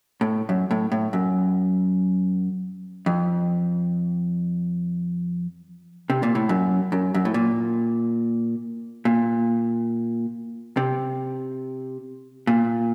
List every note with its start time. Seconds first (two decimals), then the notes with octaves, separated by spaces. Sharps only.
0.21 A2
0.49 F#2
0.71 A2
0.92 A2
1.13 F#2
3.06 F2
6.10 C3
6.23 A#2
6.35 A2
6.49 F#2
6.92 F#2
7.14 F#2
7.25 A2
7.34 A#2
9.05 A#2
10.77 C3
12.47 A#2